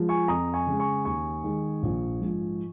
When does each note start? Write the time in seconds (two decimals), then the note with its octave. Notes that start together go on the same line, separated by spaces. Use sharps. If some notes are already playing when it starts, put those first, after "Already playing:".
Already playing: F3 G#3
0.09 G#5 C#6
0.28 F2 A#5 D#6
0.54 G#5 C#6
0.66 C#3 G#3
0.79 G#5 C#6
1.05 D#2 G#5 C#6
1.44 D#3 G#3
1.83 A#1
2.21 G#2 F3